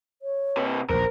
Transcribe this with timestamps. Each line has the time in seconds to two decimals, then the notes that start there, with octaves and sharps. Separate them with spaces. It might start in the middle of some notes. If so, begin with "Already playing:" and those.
0.22 C#5
0.57 C3 B4
0.90 A#1 D#2 A#4 C5